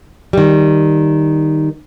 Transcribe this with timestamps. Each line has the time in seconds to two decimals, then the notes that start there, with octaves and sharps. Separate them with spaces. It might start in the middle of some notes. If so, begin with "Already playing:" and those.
0.33 D#3 G3